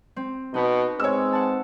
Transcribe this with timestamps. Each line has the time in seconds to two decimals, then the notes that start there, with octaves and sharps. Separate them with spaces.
0.16 C4
0.54 B2 D#4 B4
1.00 G#3 C4 C#5 E6
1.33 F#5 A5